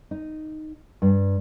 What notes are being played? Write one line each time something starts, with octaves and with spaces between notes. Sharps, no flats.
D#4
G2